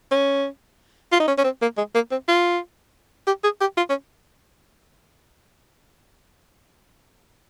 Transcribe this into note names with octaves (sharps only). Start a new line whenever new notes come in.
C#4
F4
D#4
C#4
C#4
C4
A#3
G#3
A#3
C4
F4
G4
G#4
G4
F4
C#4